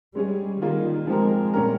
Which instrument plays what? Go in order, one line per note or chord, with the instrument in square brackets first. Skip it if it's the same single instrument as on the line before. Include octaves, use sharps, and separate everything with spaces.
[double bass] G3 [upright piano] G#3 C#4 G#4
[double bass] D#3 [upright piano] G3 A#3 F4 G#4
[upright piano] F3 C4 G4 A#4 [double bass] G#3
[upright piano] A#2 G3 C#4 G4 A#4